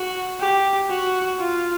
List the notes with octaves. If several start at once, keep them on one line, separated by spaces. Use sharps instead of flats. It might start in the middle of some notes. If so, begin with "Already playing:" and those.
Already playing: F#4
G4
F#4
F4